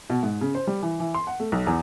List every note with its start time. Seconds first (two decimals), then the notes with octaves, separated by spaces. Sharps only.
0.10 B2
0.23 G#2
0.41 C#3
0.55 C5
0.67 G3
0.82 E3
1.00 E3
1.14 C6
1.27 F#5
1.40 A3
1.52 B1
1.67 E2